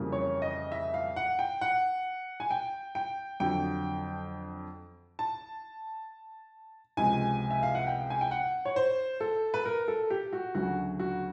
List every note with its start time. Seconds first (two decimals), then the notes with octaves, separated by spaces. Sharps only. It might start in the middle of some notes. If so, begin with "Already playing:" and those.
Already playing: F2 C#3 E3 G3 A#3
0.12 C#5
0.42 D#5
0.72 E5
0.94 F5
1.16 F#5
1.39 G5
1.61 F#5
2.40 G#5
2.51 G5
2.95 G5
3.40 F2 D3 F#3 G5
5.19 A5
6.97 C#2 C3 F3 G#3 G#5
7.51 E5
7.63 F5
7.75 F#5
7.87 G5
8.10 G#5
8.21 G5
8.31 F#5
8.65 C#5
8.76 C5
9.20 A4
9.54 B4
9.65 A#4
9.88 A4
10.10 G4
10.33 F#4
10.55 D2 C#3 F#3 F#4
10.99 F#4